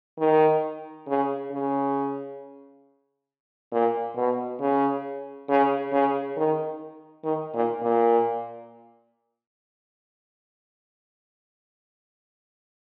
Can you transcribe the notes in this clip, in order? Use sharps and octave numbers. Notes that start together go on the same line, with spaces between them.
D#3
C#3
C#3
A#2
B2
C#3
C#3
C#3
D#3
D#3
A#2
A#2